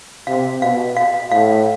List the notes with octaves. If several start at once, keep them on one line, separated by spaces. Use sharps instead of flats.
C3 F5
B2 F5
F5
A2 F5